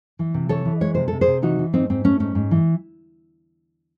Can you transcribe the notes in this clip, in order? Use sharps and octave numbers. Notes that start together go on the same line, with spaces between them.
E3
C3
E3 A4 C#5
E3
G#3 C#5
C3 C5
C3 A4
G#4 C5
C3
E3 D#4 F#4
E3
G#2 C4 D#4
G#2 C4
A3 C#4
G#2 C#4
G#2
E3